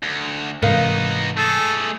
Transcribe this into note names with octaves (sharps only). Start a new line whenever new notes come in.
D2
G#2 C3 E3 B3 D#4 A#4 F5
A3 G#4 A4